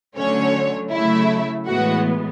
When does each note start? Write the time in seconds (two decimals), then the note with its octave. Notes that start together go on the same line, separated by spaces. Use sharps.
0.16 D3 F#3 A3 C#4 C#5
0.91 C#3 F#3 A3 E4 E5
1.67 A2 E3 G#3 B3 F#4 F#5